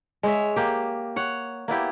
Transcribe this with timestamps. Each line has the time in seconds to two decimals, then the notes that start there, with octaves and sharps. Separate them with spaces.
0.23 G#3 C#5 E5
0.56 A#3 G4
1.16 C#5 F#5
1.68 A#3 B3 E4 G4